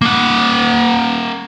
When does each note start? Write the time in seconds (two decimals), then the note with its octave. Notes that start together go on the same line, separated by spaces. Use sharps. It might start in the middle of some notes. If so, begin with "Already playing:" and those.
0.02 A#3 F#5